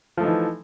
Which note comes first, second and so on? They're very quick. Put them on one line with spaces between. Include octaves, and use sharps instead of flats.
F3 A3 D#4 E3